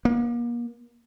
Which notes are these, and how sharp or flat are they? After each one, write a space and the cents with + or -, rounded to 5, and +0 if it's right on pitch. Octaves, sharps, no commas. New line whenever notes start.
A#3 +35